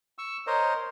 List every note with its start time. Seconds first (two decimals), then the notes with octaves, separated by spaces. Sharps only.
0.18 C#6 E6
0.47 A#4 C5 C#5 D#5